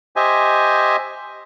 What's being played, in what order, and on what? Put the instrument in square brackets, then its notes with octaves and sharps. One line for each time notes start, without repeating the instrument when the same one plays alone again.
[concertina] G4 C5 D#5 E5 G#5